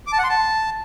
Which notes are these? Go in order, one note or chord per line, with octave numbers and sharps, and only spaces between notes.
D6
A5
F#5
C6
A5